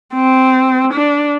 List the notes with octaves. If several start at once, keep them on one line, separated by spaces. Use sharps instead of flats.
C4
D4